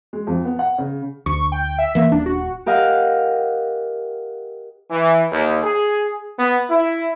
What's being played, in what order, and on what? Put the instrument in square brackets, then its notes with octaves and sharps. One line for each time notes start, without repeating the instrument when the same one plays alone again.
[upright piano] G#3
F2
B3
F#5
C#3
[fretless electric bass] D2 [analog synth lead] C#6
[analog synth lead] G5
E5
[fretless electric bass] E3 A#3
[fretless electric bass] D#1 [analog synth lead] D4
[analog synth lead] F#4
[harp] G4 A#4 D#5 F5 F#5
[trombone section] E3
D#2
G#4
B3
E4